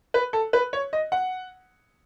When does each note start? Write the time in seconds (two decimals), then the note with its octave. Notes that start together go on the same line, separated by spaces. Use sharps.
0.14 B4
0.33 A4
0.53 B4
0.73 C#5
0.93 D#5
1.12 F#5